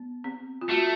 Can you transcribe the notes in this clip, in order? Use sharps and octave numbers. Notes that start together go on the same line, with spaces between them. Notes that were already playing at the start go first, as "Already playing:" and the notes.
Already playing: B3
C4
F4
A3 F#4